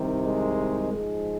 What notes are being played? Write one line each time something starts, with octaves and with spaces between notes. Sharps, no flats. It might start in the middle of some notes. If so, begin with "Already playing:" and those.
Already playing: C2 C3 D#3
G#3
G#2 F3 G#3